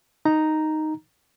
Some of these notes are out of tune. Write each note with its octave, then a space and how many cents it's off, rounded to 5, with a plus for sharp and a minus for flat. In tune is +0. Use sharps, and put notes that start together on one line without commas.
D#4 +0 A#5 +0